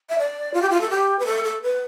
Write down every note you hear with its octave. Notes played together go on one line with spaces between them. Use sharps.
E5
D5
F4
G4
F4
A4
G4
B4
A4
A4
B4